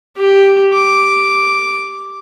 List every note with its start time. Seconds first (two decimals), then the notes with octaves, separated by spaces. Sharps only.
0.16 G4
0.74 D6